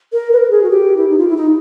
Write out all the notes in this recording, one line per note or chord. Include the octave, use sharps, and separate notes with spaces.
A#4
B4
A#4
G#4
F#4
G4
E4
D#4
F4
E4
D#4